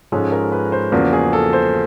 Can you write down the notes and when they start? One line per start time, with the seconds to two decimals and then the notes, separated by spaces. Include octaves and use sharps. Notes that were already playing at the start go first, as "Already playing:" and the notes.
0.12 G#2 F3 G#3 C#4 A4
0.32 A#4
0.52 B4
0.72 C5
0.92 E2 C#3 F3 A#3 F#4
1.13 G#4
1.33 A4
1.53 C5